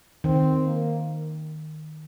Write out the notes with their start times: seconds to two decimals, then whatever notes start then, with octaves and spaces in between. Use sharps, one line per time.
0.24 D#3 C4
0.67 A#3